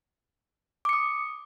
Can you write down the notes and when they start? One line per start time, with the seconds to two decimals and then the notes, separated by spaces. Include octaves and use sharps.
0.85 D6
0.89 C#7
0.93 D#6